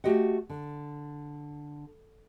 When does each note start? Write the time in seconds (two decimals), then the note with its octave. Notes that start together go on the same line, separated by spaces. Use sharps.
0.04 A3 F#4 G4 D#5 F#5
0.50 D3